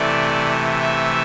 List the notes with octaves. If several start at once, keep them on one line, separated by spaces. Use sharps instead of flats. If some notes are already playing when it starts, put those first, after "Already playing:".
Already playing: C3 E3 A3 D5
E5